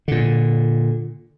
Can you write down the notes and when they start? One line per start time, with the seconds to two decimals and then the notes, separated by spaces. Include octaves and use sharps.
0.08 A#2 D3